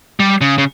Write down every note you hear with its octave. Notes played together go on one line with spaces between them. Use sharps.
G3
C#3
C#3